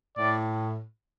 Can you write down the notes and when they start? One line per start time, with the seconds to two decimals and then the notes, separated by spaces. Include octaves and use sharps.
0.17 A2 D5